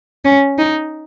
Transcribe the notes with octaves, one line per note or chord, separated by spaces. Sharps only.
C#4
D#4